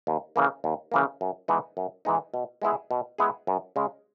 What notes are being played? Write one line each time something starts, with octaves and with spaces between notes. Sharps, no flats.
D#2
C#3 E3 A#3
D#2
C#3 E3 A#3
F#2
E3 G#3 B3 D#4
F#2
E3 G#3 B3 D#4
B2
G#3 B3 E4 G#4
B2
G#3 B3 E4 G#4
F#2
C#3 G#3